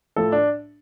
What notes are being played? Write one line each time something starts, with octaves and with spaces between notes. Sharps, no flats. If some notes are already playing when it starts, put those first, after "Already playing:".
A2 F3 A4
D4